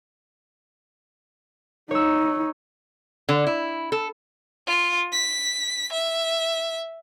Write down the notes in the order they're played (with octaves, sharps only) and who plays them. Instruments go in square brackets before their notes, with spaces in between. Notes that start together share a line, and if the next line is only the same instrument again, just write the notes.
[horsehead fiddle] D#4 [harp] C#5 E6
[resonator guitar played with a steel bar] D3
E4
A4
[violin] F4
B6
E5